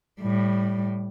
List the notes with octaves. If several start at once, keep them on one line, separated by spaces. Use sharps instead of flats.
A2 G3